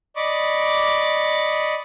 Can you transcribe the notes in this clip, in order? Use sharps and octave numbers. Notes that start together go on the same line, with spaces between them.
D5 D#5 B5 C#6 D6